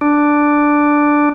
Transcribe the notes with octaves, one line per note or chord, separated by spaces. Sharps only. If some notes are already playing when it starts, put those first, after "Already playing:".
D4